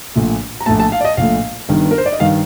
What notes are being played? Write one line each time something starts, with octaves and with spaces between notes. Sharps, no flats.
A#1 A#2 A3
A#5
A#1 A#2 A3 A5
A5
F5
D5
D#5
A#1 A#2 A3 F5
G1 G2 D#3
A#4
C5
D5
D#5
G2 D#3 F5